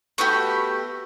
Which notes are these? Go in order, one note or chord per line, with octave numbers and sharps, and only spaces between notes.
A3 B3 F#4 G4